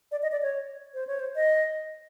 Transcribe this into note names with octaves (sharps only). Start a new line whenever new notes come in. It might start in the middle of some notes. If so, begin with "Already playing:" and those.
D5
D#5
D5
C#5
C5
C#5
C5
D#5